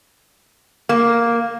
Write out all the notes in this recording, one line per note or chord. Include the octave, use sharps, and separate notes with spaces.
A#3